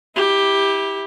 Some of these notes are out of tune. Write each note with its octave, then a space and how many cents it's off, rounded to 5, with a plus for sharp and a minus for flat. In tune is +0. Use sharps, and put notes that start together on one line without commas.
E4 -25 G4 +10